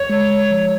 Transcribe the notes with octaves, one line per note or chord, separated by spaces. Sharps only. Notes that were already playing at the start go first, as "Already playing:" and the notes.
Already playing: F#2 C#5
G#3
G#3
F3